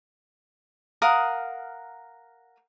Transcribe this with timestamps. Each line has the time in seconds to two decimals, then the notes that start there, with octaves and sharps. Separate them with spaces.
1.02 A#4 F5 F#5 D#6